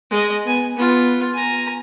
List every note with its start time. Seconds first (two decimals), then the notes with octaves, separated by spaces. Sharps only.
0.11 G#3 D#5
0.45 B3 G#5
0.76 B3 F4
1.34 G#5 A#5